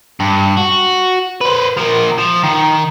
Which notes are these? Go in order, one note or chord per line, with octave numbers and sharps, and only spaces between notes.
G2
F#4
B4 C5
F3 A#4
F3
D#3